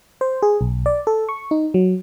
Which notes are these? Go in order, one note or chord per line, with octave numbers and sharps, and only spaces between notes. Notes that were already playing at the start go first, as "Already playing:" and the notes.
C5
G#4
B1
D5
A4
C#6
D#4
F#3